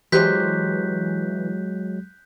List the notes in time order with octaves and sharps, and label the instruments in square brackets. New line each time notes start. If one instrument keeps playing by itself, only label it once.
[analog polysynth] E3 [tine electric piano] F#3 G#3 [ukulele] G4 C5 [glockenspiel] F#6 G6 B6